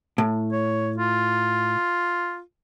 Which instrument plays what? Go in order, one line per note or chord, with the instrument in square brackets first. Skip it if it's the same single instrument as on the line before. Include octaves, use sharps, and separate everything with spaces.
[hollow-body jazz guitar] A2
[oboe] C#5
F4